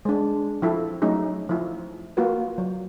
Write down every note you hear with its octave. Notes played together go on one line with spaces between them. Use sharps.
G#3 D4
F3 E4 A4
F#3 A3 C#4 D#4 G#4
F3 E4
A#3 F4 F#4 B4
F#3